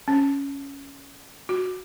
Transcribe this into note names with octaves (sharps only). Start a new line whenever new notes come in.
C#4
F#4